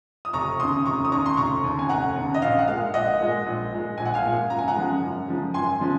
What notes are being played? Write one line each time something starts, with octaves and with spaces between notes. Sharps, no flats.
D#6
F1 A#5 C#6
D#2 C#3 C6 D#6
F1 A#5 C#6
D#6
D#2 C#3 A#5 C#6
C6
F1 A#5 C#6
D#2 C#3
G#5
F1 F#5 A#5
D#2 C#3
D#5
A#1 F5
F#5
A#2 G#3 F5
A#1 D#5 F#5
A#2 G#3
A#1
A#2 G#3
A#1 G#5
F#5
F5 G#5
A#2 G#3
F#2 A#5
G#5
F#5 A#5
C#3 F3 G#3
F#2
C#3 F3 G#3
F#2 G#5 C6
C#3 F3 G#3